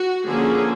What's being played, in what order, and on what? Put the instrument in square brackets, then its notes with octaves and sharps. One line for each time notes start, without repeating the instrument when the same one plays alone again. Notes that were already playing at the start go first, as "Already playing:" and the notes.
Already playing: [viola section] F#4
D3 F3 A#3 C#4 G#4